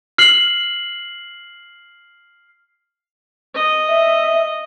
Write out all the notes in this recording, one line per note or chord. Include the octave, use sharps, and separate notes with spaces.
F6 C7 F#7
D#5
E5